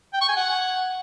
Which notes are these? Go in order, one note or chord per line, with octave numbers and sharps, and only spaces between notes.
G5
C#6
G#5
F#5